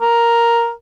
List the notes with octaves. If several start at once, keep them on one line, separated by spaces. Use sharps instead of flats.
A#4